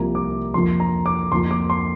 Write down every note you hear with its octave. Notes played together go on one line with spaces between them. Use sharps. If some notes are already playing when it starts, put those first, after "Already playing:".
Already playing: C2 C3 F3 A#3 A#5
D6
F2 F3 A#3 C6
A#5
D6
F2 F3 A#3 C6
D6
C6